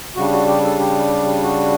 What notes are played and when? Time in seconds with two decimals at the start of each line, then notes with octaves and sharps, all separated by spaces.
0.16 C#3 G3 D4 F#4
0.33 F#4
0.48 G4
0.64 A4
0.79 G4
1.42 F#4